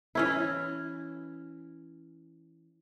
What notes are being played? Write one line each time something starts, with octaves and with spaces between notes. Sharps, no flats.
E3 C#4 E4